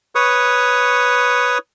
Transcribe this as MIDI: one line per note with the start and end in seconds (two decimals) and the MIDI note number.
0.15 1.58 71
0.15 1.58 73
0.15 1.58 85
0.15 1.58 87